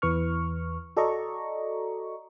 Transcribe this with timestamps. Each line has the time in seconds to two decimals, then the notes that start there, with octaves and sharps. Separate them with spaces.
0.02 E2 E3 B4 C#6 F6
0.97 F#4 A4 D5 D#5 A#5 C#6